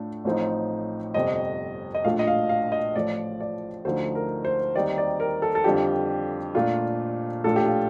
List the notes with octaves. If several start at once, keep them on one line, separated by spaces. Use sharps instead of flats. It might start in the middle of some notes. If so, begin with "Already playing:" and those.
Already playing: A2 A3 D4 F4
A1 A2 F3 C4 D#4
G1 F2 C3 D#5
D#5
A#1 A2 A3 D4 F4 F5
D#5
F5
F5
D#5
A1 A2 F3 A3 D5
D5
D2 D3 F3 A3 D#4 C5
A#4
C5
D#2 D#3 G3 C4 D#4 D5
D5
A#4
A4
A4
F2 D3 G3 D4 F4 G4
A#2 A3 D4 F4
A#1 A2 A3 D4 F4 A4
G4
F4